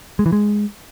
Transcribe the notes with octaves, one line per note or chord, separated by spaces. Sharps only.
G#3
E3
G#3